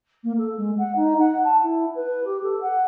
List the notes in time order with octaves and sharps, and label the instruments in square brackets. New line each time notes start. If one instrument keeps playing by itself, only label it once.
[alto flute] A#3
A4
G#3
F#5
D#4
F#5
A5
E4
B4
G4
A4
F#5